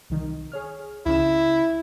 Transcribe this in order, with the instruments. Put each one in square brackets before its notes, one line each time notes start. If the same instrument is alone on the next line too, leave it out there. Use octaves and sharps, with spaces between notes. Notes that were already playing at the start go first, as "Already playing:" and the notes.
[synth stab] C2 D#3
G#4 C#5 F6
[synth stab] C#2 C#3 E7 [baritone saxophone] E4